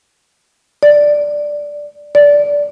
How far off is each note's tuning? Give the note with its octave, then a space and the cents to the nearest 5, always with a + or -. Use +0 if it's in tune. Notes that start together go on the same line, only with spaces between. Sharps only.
D5 +0
D5 -10